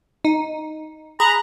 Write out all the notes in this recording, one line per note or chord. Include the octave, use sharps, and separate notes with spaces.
D#4
G#4 A#5 B5 F#6